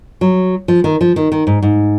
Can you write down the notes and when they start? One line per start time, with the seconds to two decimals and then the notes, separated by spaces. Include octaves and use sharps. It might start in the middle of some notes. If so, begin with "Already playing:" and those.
0.21 F#3
0.68 F3
0.84 D#3
1.01 F3
1.16 D#3
1.32 D#3
1.47 G#2
1.62 G#2